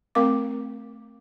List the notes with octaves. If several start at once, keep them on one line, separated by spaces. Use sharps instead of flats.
A3 C4 A#4 F5 D6